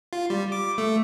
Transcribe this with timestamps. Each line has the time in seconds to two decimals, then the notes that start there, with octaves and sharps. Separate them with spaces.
0.13 F4
0.30 G3
0.52 D6
0.78 A3